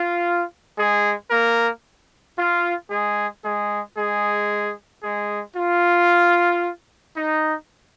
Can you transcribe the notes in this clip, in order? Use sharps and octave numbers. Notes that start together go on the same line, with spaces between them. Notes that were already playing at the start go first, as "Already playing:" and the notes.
Already playing: F4
G#3 G#4
A#3 A#4
F4
G#3 G#4
G#3 G#4
G#3 G#4
G#3 G#4
F4
D#4